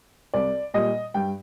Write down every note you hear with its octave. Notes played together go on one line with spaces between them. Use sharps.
C2 D5
A#2 G3 D#5
G2 G5